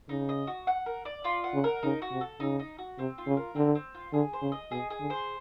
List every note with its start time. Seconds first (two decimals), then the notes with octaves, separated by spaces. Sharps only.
0.09 C#3 D#4
0.29 D#5
0.47 F#4
0.67 F#5
0.86 A#4
1.05 D5
1.24 F4
1.44 F#5
1.54 C#3
1.64 A#4
1.83 C#3 D#4
2.02 F#4
2.11 C3
2.21 A4
2.40 C#3 D#4
2.59 D#4
2.78 F#4
2.99 C3 C4
3.18 F4
3.27 C#3
3.37 A#4
3.56 D3 C4
3.75 C4
3.94 F4
4.13 D3 G#4
4.33 C5
4.42 C#3
4.52 D#5
4.71 B2 G#4
4.90 G#4
5.00 D3
5.10 C5